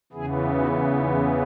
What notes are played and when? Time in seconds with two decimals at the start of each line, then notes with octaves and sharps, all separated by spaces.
0.13 E2 C#3 E3 B3 E4 G#4
0.54 D#4 F#4
0.97 D#4